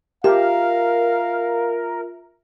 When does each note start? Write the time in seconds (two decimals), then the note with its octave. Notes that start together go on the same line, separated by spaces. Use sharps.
0.24 F4 G4 A#4 E5 F5